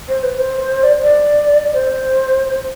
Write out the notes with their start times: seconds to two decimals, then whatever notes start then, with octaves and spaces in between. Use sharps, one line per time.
0.09 C5
0.23 B4
0.39 C5
0.83 D5
1.01 D5
1.74 C5